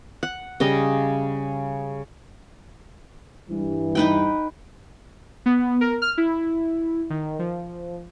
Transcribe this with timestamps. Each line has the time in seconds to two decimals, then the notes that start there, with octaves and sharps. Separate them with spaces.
0.23 F#5
0.60 C#3 G3 D#5
3.50 G2 E3
3.95 D#4 B4 G5
5.46 B3
5.81 A#4
6.02 F6
6.18 E4
7.10 D#3
7.39 F3